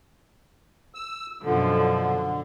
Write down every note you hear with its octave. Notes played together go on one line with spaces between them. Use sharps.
E6
F#2 B2 D3 F3